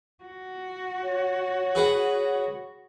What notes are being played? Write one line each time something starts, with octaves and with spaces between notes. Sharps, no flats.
F#4
C#5
G#4 B4 F#5